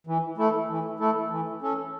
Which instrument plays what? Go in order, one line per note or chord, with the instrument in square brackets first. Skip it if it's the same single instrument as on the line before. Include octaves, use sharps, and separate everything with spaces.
[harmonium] E3
A3 E4 A4
E3
A3 E4 A4
E3
C#4 A4